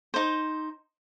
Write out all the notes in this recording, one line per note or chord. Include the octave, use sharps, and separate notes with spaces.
D#4 C5